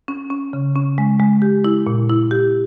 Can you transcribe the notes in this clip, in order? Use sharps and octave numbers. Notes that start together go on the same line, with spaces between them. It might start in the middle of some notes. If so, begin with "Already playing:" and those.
C#4
C#4
C#3
C#4
G#3
G#3
G4
E4
A#2
E4
G4